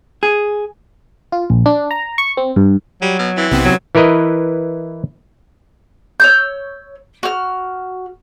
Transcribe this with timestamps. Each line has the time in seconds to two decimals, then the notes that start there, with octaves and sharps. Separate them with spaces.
0.23 G#4
1.32 F4
1.50 A#1
1.66 D4
1.91 A#5
2.18 C#6
2.37 C4
2.56 G2
3.02 F#3 G3
3.19 B2
3.37 E3 C4
3.51 B1 C3 B3 C4
3.65 F#3
3.95 E3 E4 A#4 B4 D#5
6.20 C#5 E6 G6
7.23 F#4 F6